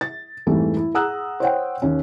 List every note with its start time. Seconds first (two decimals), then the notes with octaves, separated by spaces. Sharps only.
0.01 A6
0.46 F2 G#2 E3 G3 A3
0.77 E4
0.94 G#4 F#5 A#5 D#6 E6 F#6
1.40 C5 C#5 F#5 G5
1.82 D#2 C#4